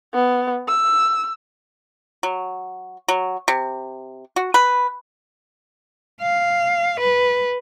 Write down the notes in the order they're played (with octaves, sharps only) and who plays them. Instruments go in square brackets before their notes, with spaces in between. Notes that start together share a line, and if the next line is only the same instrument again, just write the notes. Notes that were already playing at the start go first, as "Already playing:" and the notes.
[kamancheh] B3
E6
[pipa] F#3
F#3
C3
F#4
B4
[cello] F5
B4